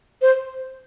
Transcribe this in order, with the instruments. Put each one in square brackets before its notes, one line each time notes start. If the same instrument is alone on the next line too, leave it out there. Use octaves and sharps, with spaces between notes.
[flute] C5